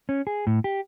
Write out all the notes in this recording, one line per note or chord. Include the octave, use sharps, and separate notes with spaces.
C#4
G#4
A2
G4